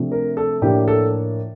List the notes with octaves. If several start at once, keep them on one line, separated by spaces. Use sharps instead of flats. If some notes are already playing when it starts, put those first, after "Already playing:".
Already playing: C3 F3 A3 D4
A#4
A4
A2 F3 A#3 D4 G4
A4